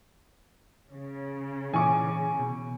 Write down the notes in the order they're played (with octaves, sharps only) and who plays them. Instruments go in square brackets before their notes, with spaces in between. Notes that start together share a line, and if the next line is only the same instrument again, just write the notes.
[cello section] C#3
[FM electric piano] A#2 E3 [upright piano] G#5 C#6 D6
[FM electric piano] B2